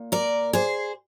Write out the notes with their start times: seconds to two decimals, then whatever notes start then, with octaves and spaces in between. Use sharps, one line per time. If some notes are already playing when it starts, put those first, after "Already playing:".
Already playing: A#2
0.12 A#4 D5
0.53 G#4 C5